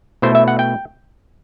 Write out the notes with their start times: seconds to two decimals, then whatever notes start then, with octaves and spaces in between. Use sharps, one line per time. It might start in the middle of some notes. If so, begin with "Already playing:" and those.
0.22 B2 A3 E4 C5
0.35 E5
0.48 F#5
0.59 G5